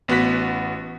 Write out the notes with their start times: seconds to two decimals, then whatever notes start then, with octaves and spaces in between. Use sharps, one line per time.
0.08 A1 B3 F#4 F#6 B6